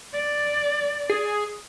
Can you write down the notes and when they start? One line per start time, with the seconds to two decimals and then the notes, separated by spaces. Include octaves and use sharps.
0.13 D5
1.10 G#4